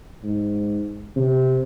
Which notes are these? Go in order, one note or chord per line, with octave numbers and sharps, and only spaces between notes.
G#2
C3